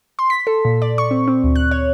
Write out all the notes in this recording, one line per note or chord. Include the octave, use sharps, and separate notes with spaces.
C6
B6
A4
A#2
D5
C#6
C4
C4
D2
F#6
C#5